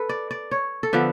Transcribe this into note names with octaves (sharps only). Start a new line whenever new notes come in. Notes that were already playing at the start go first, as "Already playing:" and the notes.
Already playing: A4 B4
D5
D5
C#5
A4
D3 F3 B3 D4 B4